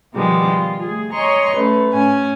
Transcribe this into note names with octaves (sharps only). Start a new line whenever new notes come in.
B2 D#3 F3 G3 G#3 B3
F4
A3 G#4
C#5 D#5 G#5 A#5 C6 C#6
A3 C#4 B4
A2 C#4 G#5